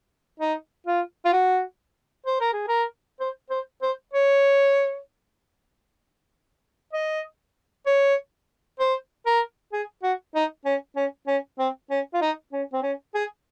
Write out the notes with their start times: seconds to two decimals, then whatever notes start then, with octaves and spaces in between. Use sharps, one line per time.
0.40 D#4
0.87 F4
1.25 F4
1.33 F#4
2.26 C5
2.41 A#4
2.53 G#4
2.68 A#4
3.20 C5
3.50 C5
3.82 C5
4.14 C#5
6.93 D#5
7.86 C#5
8.80 C5
9.26 A#4
9.73 G#4
10.03 F#4
10.35 D#4
10.65 C#4
10.96 C#4
11.27 C#4
11.59 C4
11.90 C#4
12.14 F4
12.21 D#4
12.53 C#4
12.73 C4
12.83 C#4
13.15 G#4